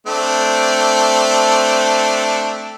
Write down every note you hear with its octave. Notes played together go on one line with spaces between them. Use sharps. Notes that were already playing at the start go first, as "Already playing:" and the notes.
A3 C4 D4